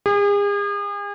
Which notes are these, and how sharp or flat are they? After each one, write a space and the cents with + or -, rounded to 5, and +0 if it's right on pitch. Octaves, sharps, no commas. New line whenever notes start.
G#4 -40